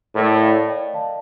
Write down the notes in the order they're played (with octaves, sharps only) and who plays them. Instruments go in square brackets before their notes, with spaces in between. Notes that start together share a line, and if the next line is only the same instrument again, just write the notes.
[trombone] A2 [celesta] A#4 D5
[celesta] D5 F5
D#5 G5
F5 A5